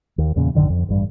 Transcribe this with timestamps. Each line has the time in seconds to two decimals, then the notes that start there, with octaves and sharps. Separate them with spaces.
0.18 D#2
0.36 E2 A#2 C#3
0.55 A1 F#2 D3 D#3
0.70 F2
0.89 A1 G2